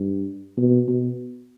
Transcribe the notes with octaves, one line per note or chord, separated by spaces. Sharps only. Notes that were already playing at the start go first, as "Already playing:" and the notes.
Already playing: G2
B2
B2